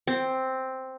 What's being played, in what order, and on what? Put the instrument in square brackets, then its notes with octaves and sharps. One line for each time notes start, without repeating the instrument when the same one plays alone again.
[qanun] C4